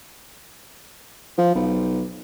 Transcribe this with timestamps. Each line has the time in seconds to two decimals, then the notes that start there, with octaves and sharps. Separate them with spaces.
1.38 F3
1.55 B1